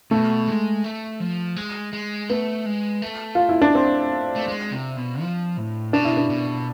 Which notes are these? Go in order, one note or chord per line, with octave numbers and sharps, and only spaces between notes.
B2 A3
G#3
A3
F3
G#3
G#3
A3 B3
G#3
A3
F4
E4
D4
C4
A3
G#3
C3
B2
F3
A2
B2 D4
E4
D4
B2